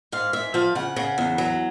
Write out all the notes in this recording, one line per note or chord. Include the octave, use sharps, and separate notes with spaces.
G#2 F5
G#2 E5
F3 F5
C#3 F#5
C#3
E2
F#3